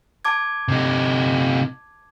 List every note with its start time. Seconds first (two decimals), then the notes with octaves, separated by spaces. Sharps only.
0.25 A5 D6 G#6
0.68 C3 D#4